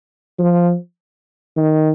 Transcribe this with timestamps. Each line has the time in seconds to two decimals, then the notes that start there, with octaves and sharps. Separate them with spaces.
0.38 F3
1.57 D#3